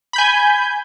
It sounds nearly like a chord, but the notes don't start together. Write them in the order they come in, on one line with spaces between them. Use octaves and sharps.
B5 G6 G#5